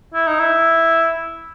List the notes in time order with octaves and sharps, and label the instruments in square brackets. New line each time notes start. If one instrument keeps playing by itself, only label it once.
[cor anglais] E4
D#4
E4